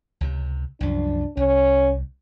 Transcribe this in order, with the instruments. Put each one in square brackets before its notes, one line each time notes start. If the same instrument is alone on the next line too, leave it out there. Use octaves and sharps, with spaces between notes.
[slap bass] C#2 C3
[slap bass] C2 F#2 F3 [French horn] D4
[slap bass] C2 [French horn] C#4